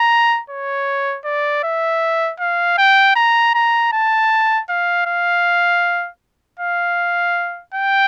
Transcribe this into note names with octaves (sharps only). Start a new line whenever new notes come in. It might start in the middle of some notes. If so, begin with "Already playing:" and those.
Already playing: A#5
C#5
D5
E5
F5
G5
A#5
A#5
A5
F5
F5
F5
G5